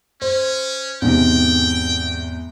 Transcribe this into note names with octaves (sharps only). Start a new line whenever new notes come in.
C#4 C5
E2 G#2 C3 G5